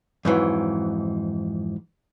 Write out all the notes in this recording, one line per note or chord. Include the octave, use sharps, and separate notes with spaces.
F2 G#2 E3 F#3